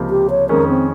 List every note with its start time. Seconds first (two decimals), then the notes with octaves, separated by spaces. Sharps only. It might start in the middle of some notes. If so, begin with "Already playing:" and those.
Already playing: C#2 C3 F3 A#3
0.10 G4
0.30 C#5
0.49 F2 D#3 G#3 C#4 A#4
0.69 C4